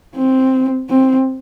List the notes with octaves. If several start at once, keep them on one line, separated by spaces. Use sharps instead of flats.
C4
C4